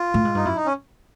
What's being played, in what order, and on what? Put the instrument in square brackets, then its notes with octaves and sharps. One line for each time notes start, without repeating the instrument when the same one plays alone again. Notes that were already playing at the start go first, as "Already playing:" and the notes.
Already playing: [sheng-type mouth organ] F4
[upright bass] A2
G#2
[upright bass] G2 [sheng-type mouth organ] D#4
[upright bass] F#2 [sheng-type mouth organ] E4
[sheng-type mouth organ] D#4
C#4